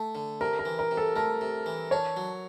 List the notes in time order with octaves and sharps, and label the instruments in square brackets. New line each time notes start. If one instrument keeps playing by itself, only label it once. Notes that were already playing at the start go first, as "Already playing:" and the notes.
Already playing: [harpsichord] A3
D3
[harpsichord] C3 [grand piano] A#4
[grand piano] A#4
[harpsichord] E3
[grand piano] A#4
[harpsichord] C3
[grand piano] A4
[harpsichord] A3 [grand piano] A#4
[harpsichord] C3
E3
[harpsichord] D4 [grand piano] C#5
[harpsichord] F#3